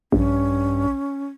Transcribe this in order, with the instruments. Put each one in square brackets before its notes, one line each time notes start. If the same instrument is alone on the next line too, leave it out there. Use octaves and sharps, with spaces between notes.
[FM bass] A#1 [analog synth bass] G2 [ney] C#4